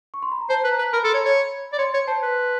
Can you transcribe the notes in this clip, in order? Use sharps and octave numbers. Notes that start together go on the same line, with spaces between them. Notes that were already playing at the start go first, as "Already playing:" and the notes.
C#6
C6
B5
A#5
C5 A5
B4
A#5
B4
A#4 B5
A4 C6
C#5 B5
C#5
D5
C#5 C6
C#5
C5 A5
B4